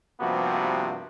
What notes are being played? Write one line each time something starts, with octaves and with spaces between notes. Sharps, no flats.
G2 C3 F3 A#3 B3 F#4